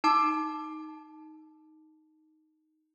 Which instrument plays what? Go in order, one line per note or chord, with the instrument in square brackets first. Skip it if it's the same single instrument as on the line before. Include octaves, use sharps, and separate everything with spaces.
[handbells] D#4 A5 D6